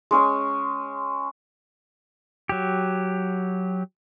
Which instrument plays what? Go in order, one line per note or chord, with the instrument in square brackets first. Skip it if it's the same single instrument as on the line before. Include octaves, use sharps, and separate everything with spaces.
[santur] G#3 C#4 G#5
[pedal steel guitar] F#3 G4